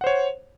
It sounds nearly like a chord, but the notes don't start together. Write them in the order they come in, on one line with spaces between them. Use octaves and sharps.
F#5 C5 C#5